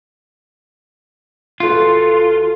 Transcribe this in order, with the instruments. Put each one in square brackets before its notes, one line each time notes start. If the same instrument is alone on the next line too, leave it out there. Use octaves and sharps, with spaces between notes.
[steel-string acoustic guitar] E2 F#4 A4 [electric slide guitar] F4